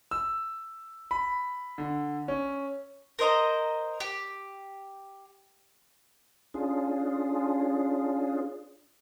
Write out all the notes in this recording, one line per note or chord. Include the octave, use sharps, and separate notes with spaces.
E6
B5
D3
C#4
A#4 C5 D#5 A#5
G4
C#4 D4 F4 G#4